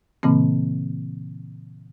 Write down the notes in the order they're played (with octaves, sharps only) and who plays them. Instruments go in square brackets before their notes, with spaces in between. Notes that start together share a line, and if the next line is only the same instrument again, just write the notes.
[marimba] A#2 C#3 E3 A#3 C4